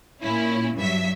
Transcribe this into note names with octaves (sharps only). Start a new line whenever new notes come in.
A#2 C#4 E4
G2 F#3 E5